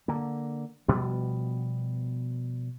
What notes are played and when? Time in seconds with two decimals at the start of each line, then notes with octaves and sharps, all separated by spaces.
0.08 D3 A#3
0.88 B2 F3 G3 B3